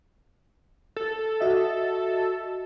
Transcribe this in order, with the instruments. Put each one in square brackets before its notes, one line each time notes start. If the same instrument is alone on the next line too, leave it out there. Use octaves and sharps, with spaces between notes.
[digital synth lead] A4
[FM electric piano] F#4 D#5 E5